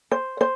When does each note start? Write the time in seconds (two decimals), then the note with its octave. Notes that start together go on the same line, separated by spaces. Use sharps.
0.11 C5
0.41 C5